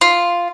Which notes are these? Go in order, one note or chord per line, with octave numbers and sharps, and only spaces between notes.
F4